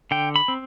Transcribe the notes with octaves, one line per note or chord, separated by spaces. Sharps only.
D3 G5
B5
C4